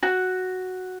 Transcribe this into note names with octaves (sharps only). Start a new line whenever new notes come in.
F#4